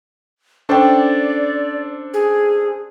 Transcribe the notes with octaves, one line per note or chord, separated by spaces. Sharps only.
C#4 D4 A4 C5 D5 G5
G#4